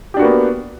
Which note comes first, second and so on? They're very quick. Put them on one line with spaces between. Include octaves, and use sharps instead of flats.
G4 D4 F#4 A#3 B3